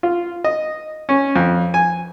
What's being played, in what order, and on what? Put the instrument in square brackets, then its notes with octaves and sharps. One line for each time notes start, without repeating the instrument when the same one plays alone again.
[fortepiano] F4
D#5
C#4
F2
G#5